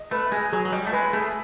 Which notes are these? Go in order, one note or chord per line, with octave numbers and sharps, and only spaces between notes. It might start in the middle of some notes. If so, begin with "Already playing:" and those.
Already playing: D#5
A3 B4
G#3 G#4
F#3 G#4
F#3
G3 D#5
A3
G#3 B4
A3 G#4